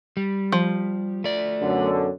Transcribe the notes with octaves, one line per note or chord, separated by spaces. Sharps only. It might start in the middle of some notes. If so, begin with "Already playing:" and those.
G3
F3
A3 D5
F#2 B2 D3